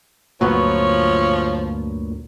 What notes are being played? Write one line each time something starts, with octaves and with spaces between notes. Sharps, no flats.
G1 D2 A#2 F3 F#3 B3 C#5